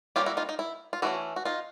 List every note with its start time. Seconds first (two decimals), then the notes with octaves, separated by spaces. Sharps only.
0.16 G3 A#3 C#4 F4 G4
0.26 E4 F#4
0.37 D#4 F4
0.49 D#4
0.59 E4
0.93 F4
1.02 E3 A3 C#4 E4 F#4
1.36 F#4
1.45 D#4 F4